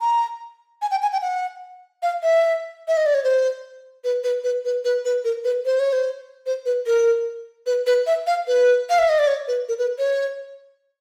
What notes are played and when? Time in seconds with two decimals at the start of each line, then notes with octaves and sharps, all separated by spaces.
0.01 A#5
0.82 G#5
0.91 G5
1.02 G#5
1.12 G5
1.22 F#5
2.03 F5
2.23 E5
2.88 E5
2.97 D#5
3.06 D5
3.14 C#5
3.24 C5
4.04 B4
4.24 B4
4.44 B4
4.65 B4
4.84 B4
5.05 B4
5.24 A#4
5.44 B4
5.65 C5
5.79 C#5
5.93 C5
6.46 C5
6.66 B4
6.86 A#4
7.66 B4
7.87 B4
8.07 E5
8.27 F5
8.47 B4
8.90 F5
8.99 E5
9.09 D#5
9.19 D5
9.27 C#5
9.48 B4
9.69 A#4
9.78 B4
9.98 C#5